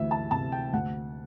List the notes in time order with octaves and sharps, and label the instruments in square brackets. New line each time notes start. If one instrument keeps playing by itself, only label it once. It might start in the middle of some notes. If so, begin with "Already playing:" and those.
Already playing: [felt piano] D2 E3 E5
A5
C3 A5
G5
D2 F#5